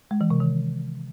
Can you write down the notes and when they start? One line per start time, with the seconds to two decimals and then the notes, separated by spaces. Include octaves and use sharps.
0.11 G#3
0.21 E3
0.30 C3
0.40 D#3